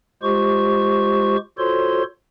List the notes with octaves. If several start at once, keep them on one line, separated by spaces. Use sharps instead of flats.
G#3 F4 G4 C5 C#6
F4 F#4 A4 C5 C#5 C6